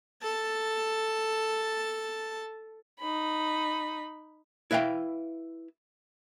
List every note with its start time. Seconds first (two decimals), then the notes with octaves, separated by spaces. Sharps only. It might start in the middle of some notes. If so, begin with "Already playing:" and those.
0.22 A4 A5
3.00 D#4 B5
4.71 E4 B4 E5 F5 G5